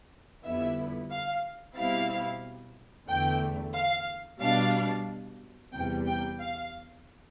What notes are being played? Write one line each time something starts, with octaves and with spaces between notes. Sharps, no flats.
F2 D3 G3 B3 E4 E5
F5
B2 G3 C4 E4 F5
E2 D3 A3 G5
F5
B2 G3 D4 F5
E2 C3 G3 G5
G5
F5